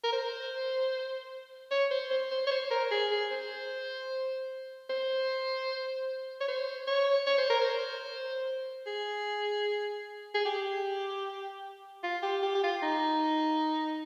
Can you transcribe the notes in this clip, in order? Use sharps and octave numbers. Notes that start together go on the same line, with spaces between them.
A#4
C5
C#5
C5
C5
C5
C#5
C5
A#4
G#4
G#4
C5
C5
C#5
C5
C#5
C#5
C5
A#4
C5
G#4
G#4
G4
F4
G4
G4
G4
F4
D#4